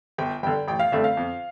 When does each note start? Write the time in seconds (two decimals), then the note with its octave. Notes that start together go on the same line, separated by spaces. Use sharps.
0.18 G1 G5
0.43 G2 D3 G5
0.68 A1 G5
0.79 F5
0.92 G2 D3 A3 C4 E5
1.04 F5
1.17 F2